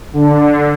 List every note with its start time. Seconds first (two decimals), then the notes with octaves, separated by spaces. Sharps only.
0.13 D3